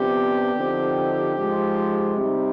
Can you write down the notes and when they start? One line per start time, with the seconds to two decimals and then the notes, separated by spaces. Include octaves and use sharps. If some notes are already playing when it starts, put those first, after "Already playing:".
Already playing: C3 F3 B3 D4 G4
0.56 D3 F3 C4 D#4
1.37 G#2 F3 G#3
2.17 C3 G3 C4 D#4